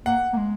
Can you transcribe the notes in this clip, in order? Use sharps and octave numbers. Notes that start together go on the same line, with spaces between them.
A#3 F#5
A#3
G#3